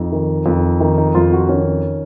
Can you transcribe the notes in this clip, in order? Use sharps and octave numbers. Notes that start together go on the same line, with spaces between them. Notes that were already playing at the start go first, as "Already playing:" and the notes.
Already playing: F2 D#4
D#3
F2
D#3 D#4
D#4
F2 F4
F#4
D#3 C#4